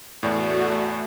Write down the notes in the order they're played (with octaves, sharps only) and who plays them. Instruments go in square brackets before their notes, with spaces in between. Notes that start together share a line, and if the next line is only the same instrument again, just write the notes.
[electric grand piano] E2 A2 [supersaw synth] A3 F#4 [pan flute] D5